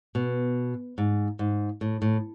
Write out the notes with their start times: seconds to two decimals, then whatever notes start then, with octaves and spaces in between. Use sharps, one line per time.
0.15 B2
0.98 G#2
1.39 G#2
1.81 A2
2.02 A2